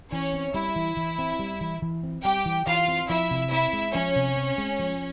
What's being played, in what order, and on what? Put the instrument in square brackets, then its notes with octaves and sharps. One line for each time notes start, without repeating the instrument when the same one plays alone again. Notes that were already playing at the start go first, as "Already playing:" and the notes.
[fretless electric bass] E3 [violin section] C#4 C#5
[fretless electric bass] C4
[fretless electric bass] G3 [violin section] E4 E5
[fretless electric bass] E3
E3
C4
G3
E3
E3
C4
[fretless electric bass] G3 [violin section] G4 G5
[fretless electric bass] E3
[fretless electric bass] E3 [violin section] F4 F5
[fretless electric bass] C4
[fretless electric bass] F3 [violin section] E4 E5
[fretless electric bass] C3
[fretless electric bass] C4 [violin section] E4 E5
[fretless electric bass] G#3
[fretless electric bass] F3 [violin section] C#4 C#5
[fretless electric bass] C3
C4
G#3
F3